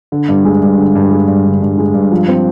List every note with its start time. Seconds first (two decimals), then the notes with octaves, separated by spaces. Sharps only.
0.12 D3
0.29 G2
0.45 G#3
0.62 G2
0.78 D3
0.95 G2
1.11 G#3
1.28 G2
1.45 D3
1.62 G2
1.78 G#3
1.94 G2
2.11 F3
2.28 C4